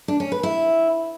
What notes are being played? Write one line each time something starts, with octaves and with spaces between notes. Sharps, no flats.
D4
C#4
B4
E4